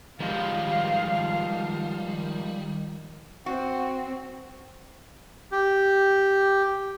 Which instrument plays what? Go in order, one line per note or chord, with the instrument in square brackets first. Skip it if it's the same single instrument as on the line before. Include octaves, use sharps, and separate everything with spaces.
[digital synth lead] D#3 [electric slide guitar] F3 G#3 F4 [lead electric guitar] G3 [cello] F5
[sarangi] C4 [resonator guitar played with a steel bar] F#4
[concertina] G4